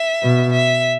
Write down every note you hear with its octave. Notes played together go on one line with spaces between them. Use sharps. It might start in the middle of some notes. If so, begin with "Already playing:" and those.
Already playing: E5
B2
E5